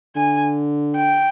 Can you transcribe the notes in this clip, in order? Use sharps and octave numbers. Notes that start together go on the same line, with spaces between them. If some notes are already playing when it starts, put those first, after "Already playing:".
D3 G#5
G5